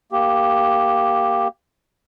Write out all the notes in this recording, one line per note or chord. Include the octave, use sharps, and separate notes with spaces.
A#3 G4